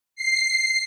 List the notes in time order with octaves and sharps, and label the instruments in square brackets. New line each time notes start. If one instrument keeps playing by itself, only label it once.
[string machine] C7